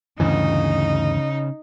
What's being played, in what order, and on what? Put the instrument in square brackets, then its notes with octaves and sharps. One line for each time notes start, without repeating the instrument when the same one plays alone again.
[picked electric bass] D2 G2 E3 [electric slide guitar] C#3 [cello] D#4